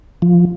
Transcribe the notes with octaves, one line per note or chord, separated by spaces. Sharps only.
F3